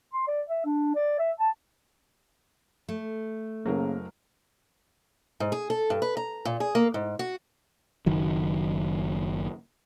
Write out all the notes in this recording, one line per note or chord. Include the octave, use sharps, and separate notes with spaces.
C6
D5
E5
D4
D5
E5
A5
A3
F#1 C#3 F#3 A#3 A#4
G#2
G#4
A4
G2
B4
A#5
A#2
G#4
A#3
G#2
F#4
F#1 D#3 F#3